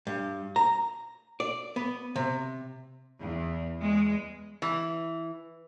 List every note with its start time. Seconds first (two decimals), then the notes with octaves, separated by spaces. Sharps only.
0.07 G2
0.56 A#5
1.40 D5
1.76 B3
2.16 C3
3.19 E2
3.79 E2 G#3
4.62 E3